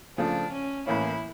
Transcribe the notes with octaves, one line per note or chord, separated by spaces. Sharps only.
C#3 F3 A3 D4
C#4
A2 E3 A#3 C#4 E4